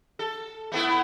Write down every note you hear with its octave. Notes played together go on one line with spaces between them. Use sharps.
A4
A3 B3 E4